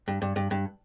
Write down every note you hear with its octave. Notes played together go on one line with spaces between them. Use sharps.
G2
G2
G2
G2